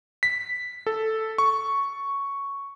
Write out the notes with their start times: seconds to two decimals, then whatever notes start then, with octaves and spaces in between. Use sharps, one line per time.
0.23 B6
0.86 A4
1.38 C#6